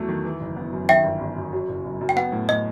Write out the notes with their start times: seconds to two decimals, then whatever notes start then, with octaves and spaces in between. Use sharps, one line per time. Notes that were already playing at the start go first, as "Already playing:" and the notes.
Already playing: E2 F#3 A3
0.09 D#3
0.24 E3
0.41 F#1
0.57 B3
0.72 F#2
0.89 D#3 E5 G5
1.04 G1
1.21 G1
1.37 F#2
1.52 F#3
1.69 F#1
1.85 F#1
2.01 F#2
2.09 G5
2.16 B3 F#5
2.32 A2
2.49 A2 D#5